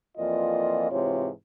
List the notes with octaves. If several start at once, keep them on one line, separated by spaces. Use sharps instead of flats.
F2 E3 A#3 F4 D5 D#5
G#2 C3 E3 F4 C#5